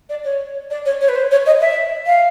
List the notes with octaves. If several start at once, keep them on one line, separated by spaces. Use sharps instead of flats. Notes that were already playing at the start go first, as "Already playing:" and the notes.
D5
C#5
D5
C#5
C#5
B4
C5
C#5
D#5
E5
F5